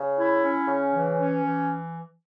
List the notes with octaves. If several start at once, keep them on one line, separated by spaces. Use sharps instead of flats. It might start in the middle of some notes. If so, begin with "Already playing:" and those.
Already playing: C#3
E4
C#4
C#3
E3
C#4
E3